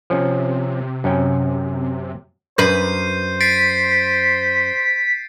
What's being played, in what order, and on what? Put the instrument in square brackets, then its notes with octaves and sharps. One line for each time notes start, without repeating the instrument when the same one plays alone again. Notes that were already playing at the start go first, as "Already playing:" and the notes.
[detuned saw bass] C3 [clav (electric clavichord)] F3 C#4
[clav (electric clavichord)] F#2 C#4 G5
[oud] F#2 B4 [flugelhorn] C5 [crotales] G6 C7 D#7
[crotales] A6 C7 D7 [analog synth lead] B6